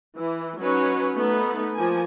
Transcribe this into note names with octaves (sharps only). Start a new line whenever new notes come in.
E3
F#3 C#4 D#4 F#4 B4 C#5
A3 B3 D#4 B4
F3 A#3 G#5